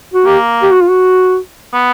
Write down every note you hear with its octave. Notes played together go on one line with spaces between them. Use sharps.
F#4
A#3 G4
G4
F#4
F4
F#4
B3